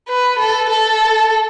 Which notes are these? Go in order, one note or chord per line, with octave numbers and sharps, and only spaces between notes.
B4
A4
A4